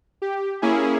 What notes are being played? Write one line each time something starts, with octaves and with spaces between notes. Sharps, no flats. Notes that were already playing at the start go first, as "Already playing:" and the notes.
G4
A#3 C#4 E4 G#4